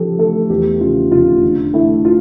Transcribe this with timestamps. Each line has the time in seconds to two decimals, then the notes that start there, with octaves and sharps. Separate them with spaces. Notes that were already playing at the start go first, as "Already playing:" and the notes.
Already playing: C#3 F3 G4 A4
0.19 A3 A4
0.50 E2 G4
0.80 C#3 F4
1.11 F1 F4
1.43 D3
1.74 A3 E4
2.05 F4